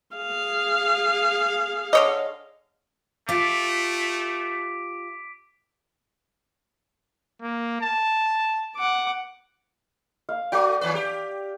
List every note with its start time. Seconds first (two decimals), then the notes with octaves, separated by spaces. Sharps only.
0.16 G#4 F5
1.93 D3 C#5 D#5
3.29 A3 F4 G4 D6 B6 D7
7.42 A#3
7.82 A5
8.76 F#5 D6
10.29 F5
10.52 A3 F#4 D5 G5
10.81 D#2 B4
10.95 G4